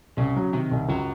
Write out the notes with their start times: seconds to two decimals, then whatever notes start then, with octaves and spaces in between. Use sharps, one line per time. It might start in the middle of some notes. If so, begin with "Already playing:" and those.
0.17 C2 C#3
0.36 F#3
0.53 C3 D#3
0.71 C2
0.89 C#2 F#2 F#3